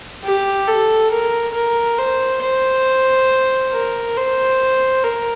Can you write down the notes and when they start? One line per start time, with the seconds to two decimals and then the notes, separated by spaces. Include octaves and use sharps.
0.24 G4
0.67 A4
1.11 A#4
1.54 A#4
1.98 C5
2.42 C5
3.73 A#4
4.17 C5
5.04 A#4